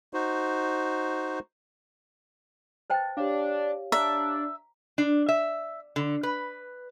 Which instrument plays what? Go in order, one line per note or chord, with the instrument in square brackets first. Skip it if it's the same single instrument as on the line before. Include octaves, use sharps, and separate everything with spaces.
[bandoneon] D#4 F#4 C5
[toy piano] B4 C5 G5 [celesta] A5 A6
[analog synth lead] D4 [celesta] G4 C#5 F5
[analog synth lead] D4 [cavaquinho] E5 [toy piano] A#5
[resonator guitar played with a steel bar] D4
E5
D3
B4